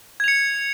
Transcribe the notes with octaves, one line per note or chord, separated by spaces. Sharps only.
G#6 C#7 F7